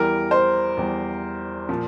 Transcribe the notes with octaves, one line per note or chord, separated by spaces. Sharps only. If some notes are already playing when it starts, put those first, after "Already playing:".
Already playing: E2 E3 G3 A#4
C5
E2 E3 G3
A#2 F3